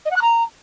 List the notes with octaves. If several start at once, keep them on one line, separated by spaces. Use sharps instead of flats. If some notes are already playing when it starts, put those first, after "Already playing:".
D#5
F#5
F#6
A#5